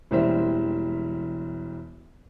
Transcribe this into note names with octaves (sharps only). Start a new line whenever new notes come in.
E1 E3 G3 A#3 C5 E5